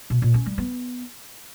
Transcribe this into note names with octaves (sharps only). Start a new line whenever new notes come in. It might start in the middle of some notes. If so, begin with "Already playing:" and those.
B2
A#2
C#4
G3
B3